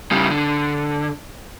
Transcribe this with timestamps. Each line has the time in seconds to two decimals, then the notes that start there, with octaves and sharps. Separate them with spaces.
0.12 C#3 G3
0.30 D3